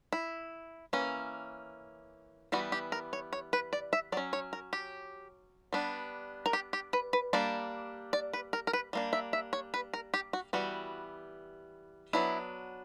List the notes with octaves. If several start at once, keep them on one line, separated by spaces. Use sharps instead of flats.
E4
E3 A#3 C#4
E3 G3 B3 F#4
G4
A#4
C#5
C#5
B4
D5
E5
F#3 C#4 D5
C#5
A#4
G4
G3 B3 D4
A#4
G4
G4
B4
B4
G3 A#3 D4 D5
D5
B4
A#4
A#4
B4
G3 A#3 D4
E5
E5
C#5
B4
A#4
G4
F#4
E3 G3 B3 F#4
F#3 B3 D4 E4